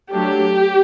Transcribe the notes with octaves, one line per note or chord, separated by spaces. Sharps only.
F#3 A3 D4 G4